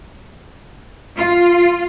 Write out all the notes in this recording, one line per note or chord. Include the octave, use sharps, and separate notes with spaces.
F4